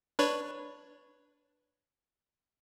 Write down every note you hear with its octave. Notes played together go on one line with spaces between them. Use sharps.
D4 B4 C#5